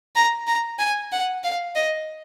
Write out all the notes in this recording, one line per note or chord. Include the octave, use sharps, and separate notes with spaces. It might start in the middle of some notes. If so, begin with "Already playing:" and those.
A#5
A#5
G#5
F#5
F5
D#5